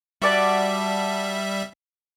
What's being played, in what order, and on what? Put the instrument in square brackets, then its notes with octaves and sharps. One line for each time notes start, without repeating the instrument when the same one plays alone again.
[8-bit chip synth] G3 E5 [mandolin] F#4 D5 A5